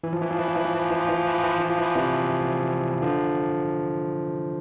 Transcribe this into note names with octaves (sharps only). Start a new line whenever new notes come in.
E3
F3
E3
F3
E3
F3
E3
F3
E3
F3
E3
F3
E3
F3
E3
F3
E3
F3
E3
F3
E3
F3
C3 E3
D3 F3